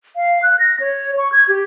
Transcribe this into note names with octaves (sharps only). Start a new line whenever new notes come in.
F5
F#6
A#6
C#5
C#6
G#6
G4